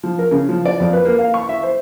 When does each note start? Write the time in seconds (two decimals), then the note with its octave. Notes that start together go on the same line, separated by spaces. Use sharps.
0.03 F3
0.19 A#4
0.31 C#3
0.49 F3
0.65 D5
0.80 F2
0.93 B4
1.05 A#3
1.18 F5
1.34 C#6
1.49 E5
1.63 C5